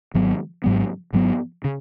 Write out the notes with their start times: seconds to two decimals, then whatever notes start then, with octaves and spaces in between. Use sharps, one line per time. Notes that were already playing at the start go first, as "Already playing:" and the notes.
0.14 G#1 G#2 F#3 B3
0.64 G#1 G#2 F#3 B3
1.13 G#1 G#2 F#3 B3
1.64 C#3